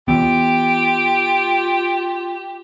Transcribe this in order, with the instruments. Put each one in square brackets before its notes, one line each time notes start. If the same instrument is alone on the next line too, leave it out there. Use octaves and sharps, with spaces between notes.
[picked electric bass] E3 B3 [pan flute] F4 [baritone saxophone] G4 [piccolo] D7